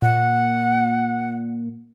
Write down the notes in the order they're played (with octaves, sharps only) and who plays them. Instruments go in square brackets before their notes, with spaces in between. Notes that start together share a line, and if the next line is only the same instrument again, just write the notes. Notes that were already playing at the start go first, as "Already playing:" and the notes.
[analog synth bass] A#2 [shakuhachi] F#5